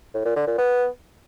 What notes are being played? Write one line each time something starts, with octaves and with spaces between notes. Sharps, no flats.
A2
A#2
D3
A#2
B3